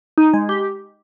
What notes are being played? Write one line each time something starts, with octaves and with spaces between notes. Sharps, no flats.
D#4
G#3
G4